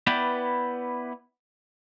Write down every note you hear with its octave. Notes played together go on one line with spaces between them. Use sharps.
B3 E4 B4 D5 G5